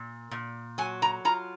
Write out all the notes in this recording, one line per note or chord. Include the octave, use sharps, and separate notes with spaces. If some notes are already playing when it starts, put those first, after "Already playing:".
Already playing: A#2
A#2
F#3 G#5
A#5
F4 A#5